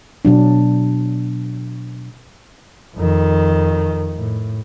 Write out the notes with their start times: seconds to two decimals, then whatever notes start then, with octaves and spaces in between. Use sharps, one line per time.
0.25 B2 F#3 D4
2.96 F2 D#3
4.16 A2